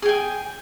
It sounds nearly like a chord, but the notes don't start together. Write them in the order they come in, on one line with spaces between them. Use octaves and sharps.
G#4 G5 G#5